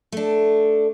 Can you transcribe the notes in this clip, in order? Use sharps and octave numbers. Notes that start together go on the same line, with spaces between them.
A3 D4